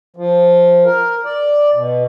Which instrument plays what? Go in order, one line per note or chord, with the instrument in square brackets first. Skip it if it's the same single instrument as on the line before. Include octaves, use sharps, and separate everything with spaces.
[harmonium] F3
A#4
D5
B2